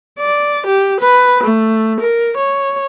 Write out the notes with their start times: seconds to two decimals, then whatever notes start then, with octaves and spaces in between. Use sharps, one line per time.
0.20 D5
0.67 G4
1.01 B4
1.44 A3
2.01 A#4
2.37 C#5